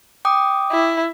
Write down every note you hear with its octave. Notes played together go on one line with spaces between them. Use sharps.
G5 D6 D#6
E4